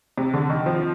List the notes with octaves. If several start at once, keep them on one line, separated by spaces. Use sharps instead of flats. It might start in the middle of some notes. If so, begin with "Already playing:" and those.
C3
D3
D#3
F3